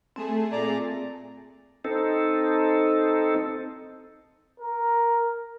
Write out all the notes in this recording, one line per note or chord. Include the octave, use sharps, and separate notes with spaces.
A3 C4 G#4 A5
A#2 D5 A#5
C4 D#4 A4
A#4